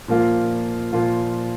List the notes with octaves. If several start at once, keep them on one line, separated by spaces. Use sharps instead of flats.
A#2 F3 A#3 F4
A#2 F3 A#3 F4